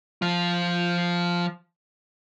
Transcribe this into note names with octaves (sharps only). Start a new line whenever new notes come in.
F3 F4